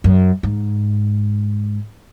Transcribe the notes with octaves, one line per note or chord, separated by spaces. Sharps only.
F#2
G#2